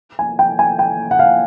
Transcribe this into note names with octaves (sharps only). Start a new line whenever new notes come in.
G#5
G5
G#5
G5
F#5
F5